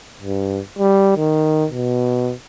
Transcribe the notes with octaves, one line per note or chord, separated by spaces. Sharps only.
G2
G3
D#3
B2